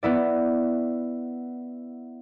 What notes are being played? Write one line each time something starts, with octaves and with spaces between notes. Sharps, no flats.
B3 E4 D5